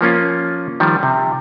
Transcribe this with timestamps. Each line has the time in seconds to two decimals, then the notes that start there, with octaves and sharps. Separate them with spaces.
0.01 F3 A#3 C#4 F4
0.80 D#3 F3 G3
1.03 C3